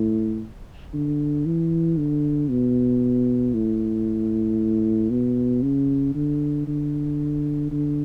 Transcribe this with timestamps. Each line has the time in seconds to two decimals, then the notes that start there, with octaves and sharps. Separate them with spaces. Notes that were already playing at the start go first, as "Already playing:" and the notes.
Already playing: A2
0.94 D3
1.46 E3
1.97 D3
2.50 B2
3.54 A2
5.11 B2
5.63 C#3
6.15 D3
6.67 D3
7.71 D3